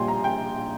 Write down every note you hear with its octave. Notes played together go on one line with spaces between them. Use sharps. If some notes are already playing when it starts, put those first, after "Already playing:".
Already playing: A#1 A#2 G3 G5 G#5 C6
A#5
G5